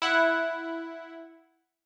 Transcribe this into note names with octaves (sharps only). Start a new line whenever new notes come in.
E4 F#5